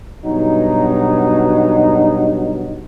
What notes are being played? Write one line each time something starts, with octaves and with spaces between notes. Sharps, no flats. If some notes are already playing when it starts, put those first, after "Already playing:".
G2 B2 F#3 D#4